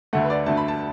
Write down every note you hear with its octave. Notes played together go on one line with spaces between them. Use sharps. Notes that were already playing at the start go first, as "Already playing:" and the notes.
D2 D3 A3 F#5
B4
D5
D2 D3 A3 A5
B5
A5